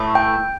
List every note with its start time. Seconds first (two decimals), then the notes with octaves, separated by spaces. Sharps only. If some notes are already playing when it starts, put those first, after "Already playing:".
Already playing: A2 E3 A3
0.15 G5